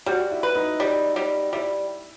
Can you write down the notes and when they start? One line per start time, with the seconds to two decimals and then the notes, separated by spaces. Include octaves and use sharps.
0.06 G3 F#4
0.31 E4
0.43 B4
0.55 D#4
0.80 G3
1.16 G3
1.53 G3 E4